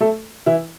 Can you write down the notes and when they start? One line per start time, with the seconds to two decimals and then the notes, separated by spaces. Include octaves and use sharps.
0.01 A3 A4
0.46 E3 E4